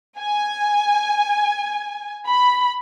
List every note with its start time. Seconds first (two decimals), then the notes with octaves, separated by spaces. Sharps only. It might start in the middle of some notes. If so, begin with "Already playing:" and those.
0.18 G#5
2.28 B5